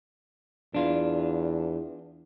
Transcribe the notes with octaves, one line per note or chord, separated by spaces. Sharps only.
E2 D4 F4